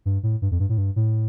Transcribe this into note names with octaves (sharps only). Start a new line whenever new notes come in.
G2
A2
G2
F2
G2
A2
G2
A2